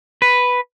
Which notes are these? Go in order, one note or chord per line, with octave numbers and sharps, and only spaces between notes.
B4